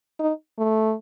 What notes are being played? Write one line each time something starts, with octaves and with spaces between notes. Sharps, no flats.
D#4
A3